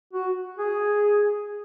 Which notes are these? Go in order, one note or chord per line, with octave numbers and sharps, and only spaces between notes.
F#4
G#4